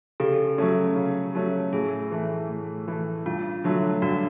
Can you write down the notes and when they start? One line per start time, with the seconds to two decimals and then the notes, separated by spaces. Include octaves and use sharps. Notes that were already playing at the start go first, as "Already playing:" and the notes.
0.20 C#3 G4 A4
0.58 F#3 A3 C#4
0.96 C#3
1.35 F#3 A3 C#4
1.73 A2 G#4
2.11 E3 A3
2.49 A2
2.88 E3 A3
3.26 G2 F4
3.64 D3 F#3 A3
4.02 G2 F#4